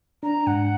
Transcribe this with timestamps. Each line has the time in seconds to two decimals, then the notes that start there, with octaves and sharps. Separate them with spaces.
0.23 D4 A#5
0.46 G#2 F#5